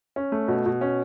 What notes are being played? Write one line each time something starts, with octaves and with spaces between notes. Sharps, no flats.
C#4
A3
B2
B2
C#4